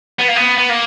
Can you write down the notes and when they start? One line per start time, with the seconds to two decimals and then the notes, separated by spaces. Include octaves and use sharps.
0.19 B3
0.28 A#3
0.36 B3
0.58 B3
0.69 A#3